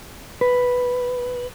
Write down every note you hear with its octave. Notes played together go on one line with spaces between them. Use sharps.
B4